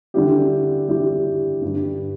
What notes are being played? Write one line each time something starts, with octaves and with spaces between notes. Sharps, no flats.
D3 G3 E4 G4
D3 G3 E4 G4
G2 D3 G3